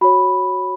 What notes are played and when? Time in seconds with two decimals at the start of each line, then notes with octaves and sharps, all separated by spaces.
0.01 F#4 C#5 B5